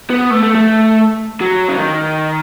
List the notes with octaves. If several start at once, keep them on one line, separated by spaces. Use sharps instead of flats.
B3
A3
A3
A3
F#3
C#3
D#3